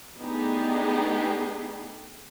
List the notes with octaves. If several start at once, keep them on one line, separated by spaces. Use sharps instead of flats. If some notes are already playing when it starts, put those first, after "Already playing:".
A3 B3 D4 D#4 G4 G#4